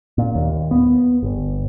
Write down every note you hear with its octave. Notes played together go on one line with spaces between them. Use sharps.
A#2
D#2
B3
G1